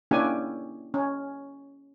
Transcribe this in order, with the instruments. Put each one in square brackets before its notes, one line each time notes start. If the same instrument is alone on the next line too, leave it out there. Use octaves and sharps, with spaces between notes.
[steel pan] A#3 C#4 D4 E4 G4 G#5
C#4